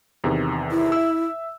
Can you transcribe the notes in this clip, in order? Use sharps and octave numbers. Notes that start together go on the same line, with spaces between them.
E2 C3 D#3
E4
E5 E6